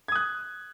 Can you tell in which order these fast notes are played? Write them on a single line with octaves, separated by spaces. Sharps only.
G#6 D#6 F#6